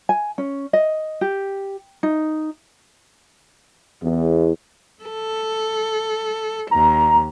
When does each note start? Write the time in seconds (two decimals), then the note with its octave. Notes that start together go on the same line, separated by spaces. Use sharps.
0.09 G#5
0.38 C#4
0.73 D#5
1.21 G4
2.03 D#4
4.02 E2
5.03 A4
6.71 D#2 A#5